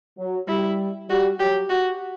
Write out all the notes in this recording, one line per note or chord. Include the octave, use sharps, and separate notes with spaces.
F#3
G3 E4
G3 F#4
F#3 G4
F#4